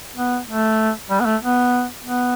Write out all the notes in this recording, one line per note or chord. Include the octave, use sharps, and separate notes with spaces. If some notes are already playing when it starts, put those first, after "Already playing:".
B3
A3
G3
B3
A3
B3
B3